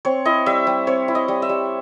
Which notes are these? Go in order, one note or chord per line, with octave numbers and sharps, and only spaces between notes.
C4 C#5
E4 D#5
G3 E5
G3
C4 C#5
E4
D#5
G3
E5
G3